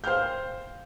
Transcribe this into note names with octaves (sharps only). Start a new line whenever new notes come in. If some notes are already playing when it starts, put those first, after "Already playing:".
C5 F5 G5 F6 G6